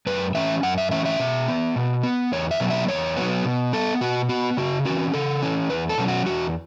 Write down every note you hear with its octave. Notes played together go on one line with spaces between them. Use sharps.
F#2 B4
E3 C#4 E5
F#2 F#5
E5
E3 C#4 E5
E5
B2
B3
B2
B3
E2 C#5
E5
B2 F#3 B3
E5
E2 C#5
B2 F#3 B3
B2
B3 A4
B2 F#4
B3 F#4
C#3 F#4
E3 C#4 F#4
C#3 A4
E3 C#4
E2 B4
A4
B2 F#3 C#4
F#4
E2 F#4